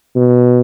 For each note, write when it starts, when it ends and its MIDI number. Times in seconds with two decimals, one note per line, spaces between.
0.16 0.61 47